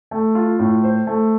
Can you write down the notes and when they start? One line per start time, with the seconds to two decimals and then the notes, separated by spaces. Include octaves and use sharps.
0.11 A3
0.35 F4
0.59 A2
0.84 C5
1.07 A3